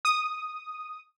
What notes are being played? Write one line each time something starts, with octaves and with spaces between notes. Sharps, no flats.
D#6